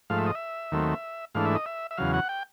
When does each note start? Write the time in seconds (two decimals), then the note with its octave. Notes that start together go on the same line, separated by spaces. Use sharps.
0.10 G#2 F3 A3 F5
0.18 E5
0.26 D#5
0.35 E5
0.72 D#2 D#3 F#3 A3 C4
1.35 G#2 E3 A3 D4 F5
1.45 E5
1.55 D#5
1.66 E5
1.91 E5
1.97 E2 C#3 F#3 F5
2.14 F#5
2.29 G5